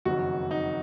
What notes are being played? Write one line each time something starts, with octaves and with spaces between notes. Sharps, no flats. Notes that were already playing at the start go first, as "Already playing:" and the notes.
F#1 F2 D#3 F#4
D#4